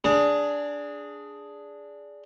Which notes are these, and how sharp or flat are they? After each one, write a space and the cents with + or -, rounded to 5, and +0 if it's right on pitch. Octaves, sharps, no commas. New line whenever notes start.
D4 -10 G#4 +0 A5 +45